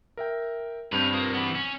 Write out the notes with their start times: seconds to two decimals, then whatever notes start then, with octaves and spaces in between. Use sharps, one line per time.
0.17 A#4 E5 G5
0.92 G2 C4 C#4 B4 G6 F7
1.13 A#3 F4 D#6
1.34 E3 B3 F#7
1.55 C#4